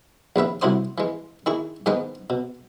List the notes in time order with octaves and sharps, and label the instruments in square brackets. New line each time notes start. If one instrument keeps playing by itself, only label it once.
[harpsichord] A#1 D#2 B4 E5
C2 C3 E4 F#4 C5 D#6
E3 G#3
D#3 E4 G#4 C#6
G#2 D#3 G#3 B3 B4 D#5
B2